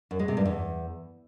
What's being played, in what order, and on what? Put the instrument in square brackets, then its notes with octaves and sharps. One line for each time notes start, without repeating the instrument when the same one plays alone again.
[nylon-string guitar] F#2
G#3
C3
G2
E2